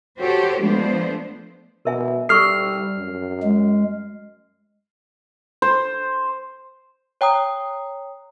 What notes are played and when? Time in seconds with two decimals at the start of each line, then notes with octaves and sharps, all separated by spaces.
0.19 F#4 G4 A4 C5 C#5
0.60 F3 G#3 A3 B3 D4 C5
1.85 B2 A#4 E5 G#5
2.29 G3 A4 C#6 E6 F6 C7
2.98 F#2
3.43 G#3
5.62 C5
7.21 C#5 G5 A#5 D#6